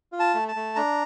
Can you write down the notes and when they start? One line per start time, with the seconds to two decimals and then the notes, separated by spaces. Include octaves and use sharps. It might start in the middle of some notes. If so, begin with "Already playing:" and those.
0.12 F4
0.20 A5
0.34 A3
0.48 A5
0.56 A3
0.76 D4 A#5